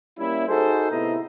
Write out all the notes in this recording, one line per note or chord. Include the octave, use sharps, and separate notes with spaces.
G3 A#3 C#4 E4
D#4 F#4 G#4 A4 C5
A2 C3 B3 E4 D#5 A#5